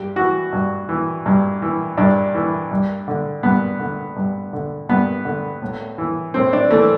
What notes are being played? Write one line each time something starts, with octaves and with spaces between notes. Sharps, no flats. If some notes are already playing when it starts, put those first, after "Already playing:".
Already playing: G2 G4
E3 F#4
G2
E3
G2
E3
G2 D4
E3
G2
D3
G2 B3
D3
G2
D3
G2 B3
D3
A2
E3
A2 C4
D4
E3 A3